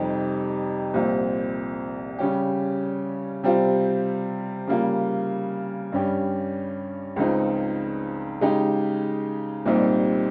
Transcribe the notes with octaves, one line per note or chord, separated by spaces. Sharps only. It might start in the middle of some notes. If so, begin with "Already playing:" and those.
Already playing: F2 C3 G3 C4 D#4
C2 A#2 F3 C4
C#3 G3 C#4 G4
C3 G3 C4 F4
C#3 G3 A#3 F4
G2 G3 C#4 G4
C#2 C#3 F3 C4 D#4
C#3 G#3 D#4 G4
C2 A#2 G3 C4 D#4